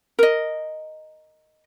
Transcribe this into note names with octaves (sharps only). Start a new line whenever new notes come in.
A#4 D#5